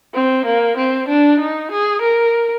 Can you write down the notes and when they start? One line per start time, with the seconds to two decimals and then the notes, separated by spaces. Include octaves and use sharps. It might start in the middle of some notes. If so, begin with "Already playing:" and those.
0.14 C4
0.45 A#3
0.77 C4
1.08 D4
1.40 D#4
1.71 G#4
2.01 A#4